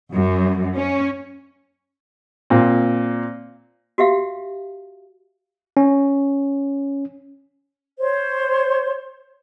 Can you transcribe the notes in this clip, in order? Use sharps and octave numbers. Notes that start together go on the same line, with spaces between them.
F#2
C#4
A#2 C4
F#4 G4 E5 F5
C#4
C5 C#5